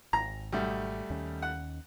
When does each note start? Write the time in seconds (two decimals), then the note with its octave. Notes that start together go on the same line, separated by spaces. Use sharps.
0.13 G#1 A#5
0.52 B1 G3 A3
1.10 D#2 D#3 C#4
1.42 F#5